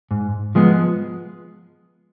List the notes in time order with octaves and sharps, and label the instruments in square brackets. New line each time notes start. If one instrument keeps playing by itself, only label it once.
[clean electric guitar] G#2
F3 G#3 B3